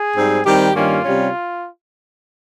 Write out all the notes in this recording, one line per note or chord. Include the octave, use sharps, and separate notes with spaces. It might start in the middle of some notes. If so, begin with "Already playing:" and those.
Already playing: G#4
G#2 G3 C4
D#3 G3 C4 G4
G2 D#3 G3 A#3 C#4 F4
C3 G3 C#4